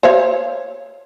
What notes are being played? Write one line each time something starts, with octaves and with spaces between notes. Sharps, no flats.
C5 C#5 F5